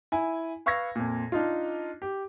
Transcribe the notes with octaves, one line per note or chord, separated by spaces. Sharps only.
E4 G#5
B4 F5 C#6 E6 G#6 A#6
F2 A#2
D4 D#4 F4
G4